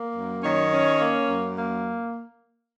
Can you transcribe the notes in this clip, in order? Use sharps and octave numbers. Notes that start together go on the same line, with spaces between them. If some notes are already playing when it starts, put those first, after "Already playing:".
Already playing: A#3
F#2
D#3 C#4 C#5
C#4
A#3
F#2
A#3